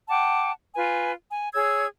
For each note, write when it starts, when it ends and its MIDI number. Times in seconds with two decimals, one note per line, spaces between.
0.08 0.52 78
0.08 0.52 79
0.08 0.52 81
0.08 0.52 86
0.76 1.11 65
0.76 1.11 71
0.76 1.11 80
1.30 1.50 80
1.54 1.86 68
1.54 1.86 73
1.54 1.86 88
1.54 1.86 92